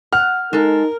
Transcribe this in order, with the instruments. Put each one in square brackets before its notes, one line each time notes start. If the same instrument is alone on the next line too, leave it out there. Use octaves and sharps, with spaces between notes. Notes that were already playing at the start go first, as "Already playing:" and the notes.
[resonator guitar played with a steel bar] F#5 [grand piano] F6
[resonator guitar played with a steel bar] G#3 A4 [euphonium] D#4 [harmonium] A#4